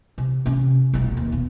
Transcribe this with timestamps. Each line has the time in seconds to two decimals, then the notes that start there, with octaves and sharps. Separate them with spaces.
0.18 C3
0.46 C3 C#4
0.93 F1 B1
1.17 D#2
1.32 B2